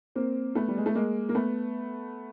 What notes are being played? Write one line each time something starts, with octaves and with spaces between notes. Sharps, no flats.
A#3 C4
A3 B3
G3
G#3
A3
G#3 A#3
A#3
A3 B3